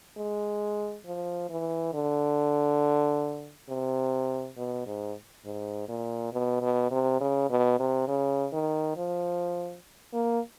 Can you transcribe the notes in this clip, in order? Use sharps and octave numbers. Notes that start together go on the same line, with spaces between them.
G#3
F3
E3
D3
C3
B2
G#2
G#2
A#2
B2
B2
C3
C#3
B2
C3
C#3
D#3
F3
A#3